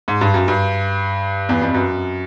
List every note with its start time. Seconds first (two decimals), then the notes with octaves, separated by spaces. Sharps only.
0.08 G#2
0.21 G2
0.34 F#2
0.48 G2
1.49 E2
1.62 F2
1.74 F#2